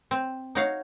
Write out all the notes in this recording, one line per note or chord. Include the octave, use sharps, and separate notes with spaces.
C4
D#4 F#4 C#5 F5